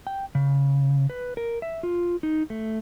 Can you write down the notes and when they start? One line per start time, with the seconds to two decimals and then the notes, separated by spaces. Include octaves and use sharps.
0.07 G5
0.35 C#3
1.10 B4
1.37 A#4
1.62 E5
1.83 F4
2.23 D#4
2.50 A3